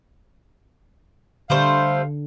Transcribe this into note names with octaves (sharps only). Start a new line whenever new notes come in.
D3 G3 A3 C5 F5